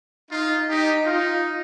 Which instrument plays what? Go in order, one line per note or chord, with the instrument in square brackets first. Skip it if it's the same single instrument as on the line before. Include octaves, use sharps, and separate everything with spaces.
[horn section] D#4 [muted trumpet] F4
[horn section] D#4 [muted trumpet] G4
[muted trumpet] D#4 [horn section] F4